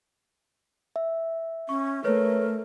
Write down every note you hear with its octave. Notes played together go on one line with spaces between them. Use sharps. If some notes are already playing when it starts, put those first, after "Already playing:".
E5
C#4 C#6
A3 A#4 B4 C#5